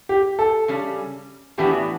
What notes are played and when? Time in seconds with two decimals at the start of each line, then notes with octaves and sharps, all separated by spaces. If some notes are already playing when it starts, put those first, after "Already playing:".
0.09 G4
0.39 A4
0.68 C#3 G3 C#4
1.58 A2 E3 B3 D4 F#4 G4